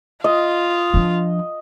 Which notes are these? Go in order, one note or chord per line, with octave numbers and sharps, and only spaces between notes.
F4 D#5
F3 D4